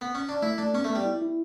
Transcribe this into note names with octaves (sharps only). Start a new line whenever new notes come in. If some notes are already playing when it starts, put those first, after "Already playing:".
B3
C#4
D4
A3 E4
A3 D4
B3 C#4
A3 B3
G3
E4
E4